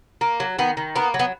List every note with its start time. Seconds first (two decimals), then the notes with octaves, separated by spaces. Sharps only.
0.21 A#3
0.40 F#3
0.59 D#3 B3
0.77 D#3
0.95 A#3 B3
1.14 F#3
1.19 B3